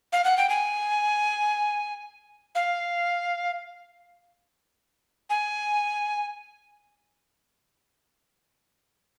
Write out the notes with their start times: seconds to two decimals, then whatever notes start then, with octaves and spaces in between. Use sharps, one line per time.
0.13 F5
0.24 F#5
0.38 G5
0.49 G#5
2.55 F5
5.30 G#5